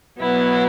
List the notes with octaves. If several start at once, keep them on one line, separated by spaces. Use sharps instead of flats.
B2 F#3 B3 E4